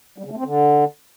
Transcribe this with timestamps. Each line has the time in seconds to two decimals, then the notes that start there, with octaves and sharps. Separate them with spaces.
0.18 G3
0.25 C#3
0.31 A3
0.38 C4
0.44 D3